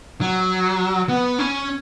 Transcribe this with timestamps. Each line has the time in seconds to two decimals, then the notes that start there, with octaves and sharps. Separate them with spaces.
0.21 F#3
1.09 B3
1.39 C#4